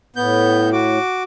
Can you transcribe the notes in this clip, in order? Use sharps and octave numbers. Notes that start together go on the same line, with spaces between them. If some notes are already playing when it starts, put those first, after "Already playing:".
A2 B3 G6
F#4 D6